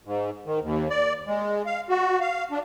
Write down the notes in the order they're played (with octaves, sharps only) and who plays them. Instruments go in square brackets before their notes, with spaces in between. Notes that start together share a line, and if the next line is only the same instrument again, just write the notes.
[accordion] G#2
D#3
D#2
D5
G#3
F5
F#4
F5
D4